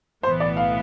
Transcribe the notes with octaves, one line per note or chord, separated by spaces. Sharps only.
B1 A2 E3 B3 C5
D5
F5